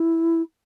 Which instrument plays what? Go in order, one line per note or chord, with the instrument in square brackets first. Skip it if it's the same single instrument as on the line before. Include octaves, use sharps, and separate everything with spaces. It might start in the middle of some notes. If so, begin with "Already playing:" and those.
Already playing: [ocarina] E4